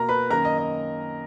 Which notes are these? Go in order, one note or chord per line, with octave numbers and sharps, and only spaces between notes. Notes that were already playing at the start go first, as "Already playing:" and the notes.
Already playing: B2 A#3 A#4 A#5
B4 B5
F#2 D#3 A#3 A#4 A#5
D#5
D#5